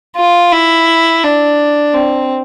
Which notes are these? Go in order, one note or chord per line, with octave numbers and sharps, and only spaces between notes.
F4
E4
D4
C4